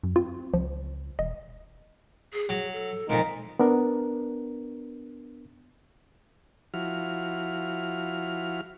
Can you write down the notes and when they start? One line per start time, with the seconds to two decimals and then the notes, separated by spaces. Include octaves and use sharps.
0.03 F#2
0.16 C4 F4
0.54 C#2 F3
1.19 E1 D#5
2.33 G#4
2.49 F#3 G#4
2.72 A4
3.09 F2 A#2 G#3 D#4
3.59 B3 D4 A#4
6.74 F3 E4 F#4 F6